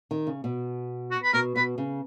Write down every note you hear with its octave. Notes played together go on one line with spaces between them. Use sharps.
D#3
C#3
B2
F#4
B4
B2 A#4
B2 B4
C#3